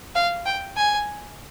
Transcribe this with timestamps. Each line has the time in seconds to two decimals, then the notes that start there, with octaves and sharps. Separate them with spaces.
0.15 F5
0.46 G5
0.77 G#5